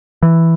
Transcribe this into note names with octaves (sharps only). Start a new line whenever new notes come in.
E3